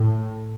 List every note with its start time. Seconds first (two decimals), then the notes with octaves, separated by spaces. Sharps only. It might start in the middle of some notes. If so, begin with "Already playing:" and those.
Already playing: A2